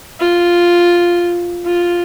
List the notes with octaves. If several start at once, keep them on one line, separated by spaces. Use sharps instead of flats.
F4
F4